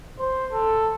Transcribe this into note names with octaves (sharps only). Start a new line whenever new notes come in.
C5
A4